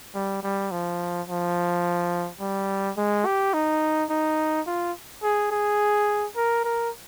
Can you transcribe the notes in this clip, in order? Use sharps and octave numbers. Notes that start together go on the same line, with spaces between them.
G3
G3
F3
F3
G3
G#3
G4
D#4
D#4
F4
G#4
G#4
A#4
A#4